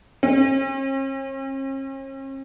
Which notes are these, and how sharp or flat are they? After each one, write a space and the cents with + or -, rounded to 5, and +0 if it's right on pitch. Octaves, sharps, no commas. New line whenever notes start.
C#4 -45